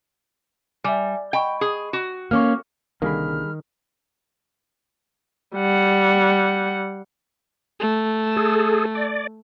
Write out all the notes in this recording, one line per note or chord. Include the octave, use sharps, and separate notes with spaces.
G3 E5 G#5
D#5 G5 B5 C#6
G#4
F#4
A#3 C#4 C#6 D6 F6
C2 D3 D#3 G3 A#3 G#4 B5 F6
G3 F#5
A3
G#4 A4
D5